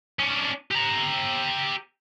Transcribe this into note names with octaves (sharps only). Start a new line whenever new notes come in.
C#4 D4
G4 A#5